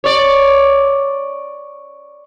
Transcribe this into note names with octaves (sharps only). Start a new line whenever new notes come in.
C#5 D5